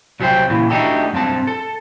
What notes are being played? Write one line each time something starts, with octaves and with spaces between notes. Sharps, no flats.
C2 F#3 G3 G#4 C5 G5
A#2 C#3 E3
A3 D4 D#4 F#4 G4 A4
B1 G2 C3 C4 A5
A4